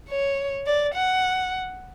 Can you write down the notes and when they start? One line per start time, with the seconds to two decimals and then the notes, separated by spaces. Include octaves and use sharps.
0.10 C#5
0.67 D5
0.95 F#5